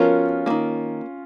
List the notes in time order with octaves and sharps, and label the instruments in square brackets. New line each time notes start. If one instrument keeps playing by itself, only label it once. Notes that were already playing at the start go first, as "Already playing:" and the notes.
Already playing: [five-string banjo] F3 B3 F#4 A#4 [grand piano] C#4 F4
[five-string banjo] F#3 A#3
D#3